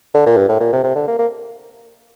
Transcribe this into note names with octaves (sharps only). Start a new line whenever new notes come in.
D3
A#2
G2
A2
A#2
C3
C3
D3
A#3
A#3